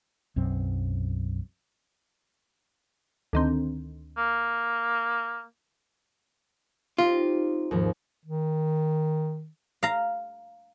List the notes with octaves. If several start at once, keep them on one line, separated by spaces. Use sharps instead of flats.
B1 F#2 F#3 C4
D2 D#3 C4
A#3
C4 D#4 F4 G4
D#2 G#2 F3
D#3
F5 A#5